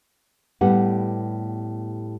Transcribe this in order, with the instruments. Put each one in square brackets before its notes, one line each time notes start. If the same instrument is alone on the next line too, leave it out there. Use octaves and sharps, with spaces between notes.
[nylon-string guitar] A2 G3 B3 G4 F#5